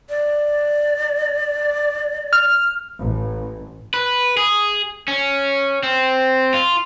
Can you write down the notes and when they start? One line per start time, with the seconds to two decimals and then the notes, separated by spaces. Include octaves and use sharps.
0.09 D5
2.33 F6
2.99 A1
3.94 B4
4.37 G#4
5.08 C#4
5.83 C4
6.54 F4